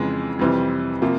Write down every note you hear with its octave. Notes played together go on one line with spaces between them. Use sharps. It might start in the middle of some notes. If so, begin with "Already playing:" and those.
Already playing: F2 C#3 E3 G#3
F2 C3 E3 G3 C4
C3 F3 A#3